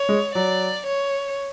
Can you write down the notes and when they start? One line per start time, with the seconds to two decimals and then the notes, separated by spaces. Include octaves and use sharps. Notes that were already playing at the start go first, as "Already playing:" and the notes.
Already playing: C#5
0.09 G#3
0.35 F#3 D5
0.86 C#5